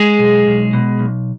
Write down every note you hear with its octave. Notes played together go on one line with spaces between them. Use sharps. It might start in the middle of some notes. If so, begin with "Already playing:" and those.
Already playing: G#3 G#4
B1
B1
B2
B1